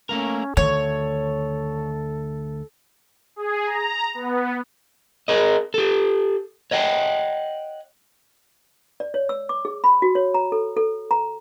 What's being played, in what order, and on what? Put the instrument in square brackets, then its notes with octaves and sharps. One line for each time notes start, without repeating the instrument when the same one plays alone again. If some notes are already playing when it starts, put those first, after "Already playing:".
[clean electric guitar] A3 A#3 A#4 [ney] C#4
[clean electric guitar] D2 [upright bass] D#3 [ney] A4 [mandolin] C#5
[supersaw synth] G#4
A#5
B3
[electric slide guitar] G#4 A#4 D#5
G4 A4
C#5 D#5 F#5 G5
[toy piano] D5
C#5
E6
D6
G#4
B5
F#4
C#5
A#5
A4
A4
A#5